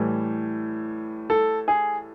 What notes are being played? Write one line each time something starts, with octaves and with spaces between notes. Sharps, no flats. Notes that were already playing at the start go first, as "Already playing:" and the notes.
Already playing: A2 E3 G3
A4
G#4